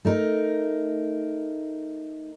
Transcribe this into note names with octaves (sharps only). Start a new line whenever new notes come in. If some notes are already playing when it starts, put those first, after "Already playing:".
A3 D#4 A#4